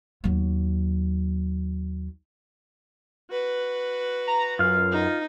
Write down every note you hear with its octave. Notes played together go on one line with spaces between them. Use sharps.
D#2 F#3
F#4 B4
A#5
F#2 F4 F5
D#4